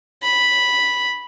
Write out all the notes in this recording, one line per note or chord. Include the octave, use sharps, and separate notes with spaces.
B5